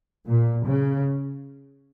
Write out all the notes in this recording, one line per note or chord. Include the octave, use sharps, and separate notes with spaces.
A#2
C#3